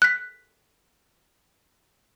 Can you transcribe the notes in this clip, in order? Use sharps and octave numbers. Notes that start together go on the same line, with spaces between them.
F#6 B6